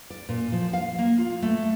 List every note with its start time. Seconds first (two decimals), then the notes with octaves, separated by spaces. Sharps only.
0.10 D5
0.29 A#2
0.52 F3
0.73 F5
0.99 A#3
1.18 F4
1.42 A3